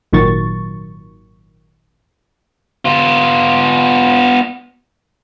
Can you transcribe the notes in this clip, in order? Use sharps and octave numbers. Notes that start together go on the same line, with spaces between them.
G#1 A#2 D#3 F#3 C#6 A6
B3 F4